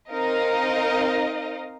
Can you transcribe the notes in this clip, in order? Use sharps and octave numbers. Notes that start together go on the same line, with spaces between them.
C4 D#4 A#4 D#5 F5